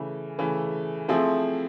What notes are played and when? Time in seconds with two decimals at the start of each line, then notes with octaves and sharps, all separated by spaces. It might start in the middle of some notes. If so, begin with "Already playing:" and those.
Already playing: C#3 E3 A3
0.39 C#3 E3 A3
1.08 F3 A3 C4 E4 G#4